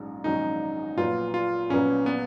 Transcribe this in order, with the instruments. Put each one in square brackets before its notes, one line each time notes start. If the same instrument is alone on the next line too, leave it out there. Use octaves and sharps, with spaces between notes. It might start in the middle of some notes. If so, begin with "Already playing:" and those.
Already playing: [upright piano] A#1 G#2 F#3 C#4
[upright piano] A#1 G#2 D#3 F#3 C#4 [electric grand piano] D#4
[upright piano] A#1 A#2 F#3 B3 [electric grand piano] F4
[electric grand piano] F4
[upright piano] A#1 A#2 F#3 B3 [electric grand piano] C#4
[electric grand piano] B3